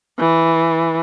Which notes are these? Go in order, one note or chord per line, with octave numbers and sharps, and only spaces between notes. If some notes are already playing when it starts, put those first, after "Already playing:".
E3